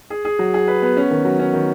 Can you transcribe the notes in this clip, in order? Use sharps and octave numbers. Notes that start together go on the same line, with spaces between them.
G#4
G#4
F#3
G#4
B4
B3
C#4
D#3
F#3
C#4
D#3